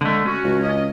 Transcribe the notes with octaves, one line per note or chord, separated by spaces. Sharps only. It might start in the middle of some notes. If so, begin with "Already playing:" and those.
D3 G#3 A3
C#4 F#4
C#2
D#5